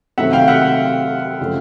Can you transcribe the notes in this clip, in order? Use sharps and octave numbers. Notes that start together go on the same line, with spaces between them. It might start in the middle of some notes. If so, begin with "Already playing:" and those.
C3 D#3 F#3 A3 C4 E5 F#5
F5 G5
E5 F#5
C#3 F3 A3